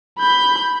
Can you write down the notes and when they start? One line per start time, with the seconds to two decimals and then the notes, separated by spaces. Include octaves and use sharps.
0.19 B5 G6